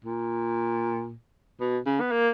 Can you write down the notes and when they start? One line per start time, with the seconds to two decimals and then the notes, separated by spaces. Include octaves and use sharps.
0.04 A#2
1.60 B2
1.86 C#3
2.00 B3
2.11 A#3